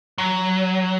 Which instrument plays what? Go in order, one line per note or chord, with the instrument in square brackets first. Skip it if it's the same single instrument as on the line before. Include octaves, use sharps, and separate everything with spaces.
[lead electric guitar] F#3